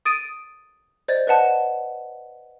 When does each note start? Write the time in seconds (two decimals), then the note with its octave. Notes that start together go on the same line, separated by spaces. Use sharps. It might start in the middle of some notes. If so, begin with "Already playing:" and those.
0.05 D#6 A6 D7 D#7
1.08 C5 D5 D#5 G#6 A6
1.27 B4 D#5 F#5 A5